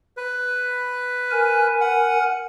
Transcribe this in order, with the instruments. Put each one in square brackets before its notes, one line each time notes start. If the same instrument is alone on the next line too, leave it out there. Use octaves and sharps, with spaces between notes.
[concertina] B4
[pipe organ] A#4 G#5
[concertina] F#5